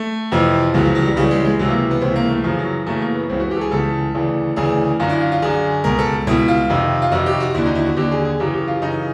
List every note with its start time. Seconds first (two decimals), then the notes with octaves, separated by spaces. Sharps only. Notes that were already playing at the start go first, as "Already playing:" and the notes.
Already playing: A3
0.32 F2 C3 E3 F3
0.74 C#2 C#3 E3 F#3
0.85 F3
0.95 F#3
1.06 G3
1.16 C#2 C#3 E3 G3
1.31 G#3
1.45 G#3
1.59 C#2 C3 E3 F#3
1.70 A#3
1.91 B3
2.01 C#2 C3 E3 C4
2.16 A#3
2.29 A3
2.44 F#2 C#3 E3 F3
2.59 F#3
2.86 F#2 C#3 E3 A3
3.01 A#3
3.15 B3
3.29 C#2 C#3 E3 C4
3.40 F#4
3.51 G4
3.56 A4
3.61 G#4
3.71 C#2 C#3 E3 A4
4.14 D2 C#3 E3
4.56 D2 C#3 E3 G#4
5.00 F#2 D3 F4
5.10 E4
5.21 F4
5.32 F4
5.42 F#2 D3 G#4
5.84 C#2 B2 A#4
5.99 A4
6.27 C#2 B2 E4
6.48 F4
6.69 F2 C3 D#3
7.02 F4
7.11 F2 C3 D#3 F#4
7.26 G4
7.40 F#4
7.55 D#2 D3 E4
7.66 D#4
7.75 E4
7.86 F#4
7.96 D#2 D3 G4
8.11 G#4
8.25 G#4
8.40 F#2 C#3 E3 G4
8.54 G4
8.68 F4
8.82 F#2 C#3 E3 D#4